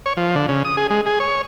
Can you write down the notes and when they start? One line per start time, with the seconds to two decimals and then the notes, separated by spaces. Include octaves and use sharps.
0.06 C#5
0.17 F3
0.35 D3
0.48 C#3
0.65 D#6
0.77 G#4
0.90 G#3
1.06 G#4
1.20 C#5